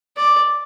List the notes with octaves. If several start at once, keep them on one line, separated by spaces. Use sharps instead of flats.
D5